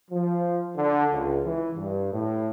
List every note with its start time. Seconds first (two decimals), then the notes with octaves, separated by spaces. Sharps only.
0.10 F3
0.76 D3
1.13 C#2
1.45 E3
1.77 G2
2.13 A2